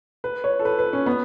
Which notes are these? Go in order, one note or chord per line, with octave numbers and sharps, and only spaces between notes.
B4
C#5
A4
B4
B4
C#4
B3